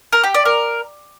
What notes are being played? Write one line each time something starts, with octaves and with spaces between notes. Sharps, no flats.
A#4
G4
D5
A#4